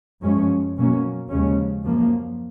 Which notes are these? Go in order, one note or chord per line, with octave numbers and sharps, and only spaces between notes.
F#2 F3 G#3 C#4
B2 F#3 A#3 C#4
D#2 C#3 F3 G#3 C#4
F#2 F3 A#3